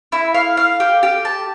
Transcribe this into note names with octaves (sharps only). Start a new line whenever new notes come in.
E4
F5
F5
G4
G4
A5